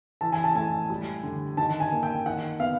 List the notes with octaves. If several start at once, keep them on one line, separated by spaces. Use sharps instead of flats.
E3 A5
G#5
A5
A2 G#5
G3
D3
D#3 A5
G#5
A#3
G5
D#3 F#5
B3 F5